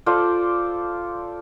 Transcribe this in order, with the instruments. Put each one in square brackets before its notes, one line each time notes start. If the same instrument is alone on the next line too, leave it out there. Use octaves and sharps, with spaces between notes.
[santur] F4 A4 C5 D5